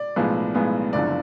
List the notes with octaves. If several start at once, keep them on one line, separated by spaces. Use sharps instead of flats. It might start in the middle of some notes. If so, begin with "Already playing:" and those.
Already playing: D5
B1 A2 F3 G#3 B3
B1 A2 F3 G#3 B3
F#1 F#2 D3 F3 D5